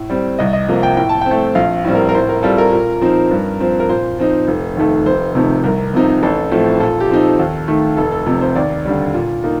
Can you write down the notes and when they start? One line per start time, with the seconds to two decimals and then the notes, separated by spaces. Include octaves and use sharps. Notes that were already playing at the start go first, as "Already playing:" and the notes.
Already playing: A2
0.10 G3 C4
0.39 C2 D#5
0.53 D#5
0.68 C3 F3 A#3
0.83 G5
0.97 A2 G5
1.09 A5
1.21 C4 G5
1.31 A3
1.55 A#1 F5
1.85 A2 G3 C4
1.95 A#4
2.09 A#4
2.15 A2 C5
2.29 A#4
2.43 G3 C4 F4 A4
2.58 A#4
2.72 A#2
3.01 F3 C4 D#4
3.31 G2
3.60 F3 C4
3.80 A#4
3.89 A#2 C5
4.19 F3 C4 D#4
4.48 F1
4.77 D#2 D#3 A3
5.06 F1 C5
5.35 F2 C3 D#3 A3
5.63 C2 A#4
5.94 C3 F3 C4 D#4
6.23 A1 A4
6.51 A2 F3 A3 C4
6.80 A#2 A4
7.00 G4
7.10 F3 C4 D#4
7.20 A4
7.39 D#2
7.68 D#3 A3
7.97 F1 A4
8.12 A4
8.26 F2 C3
8.41 C5
8.55 D#2 D5
8.85 D3 G3
9.14 A#2
9.44 A#3 D#4